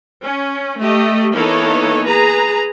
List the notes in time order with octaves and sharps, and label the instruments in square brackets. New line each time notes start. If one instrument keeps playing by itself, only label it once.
[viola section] C#4
A3 G4 D#5
E3 A#3 B3 D#4 A4 C#5
G#4 B4 A#5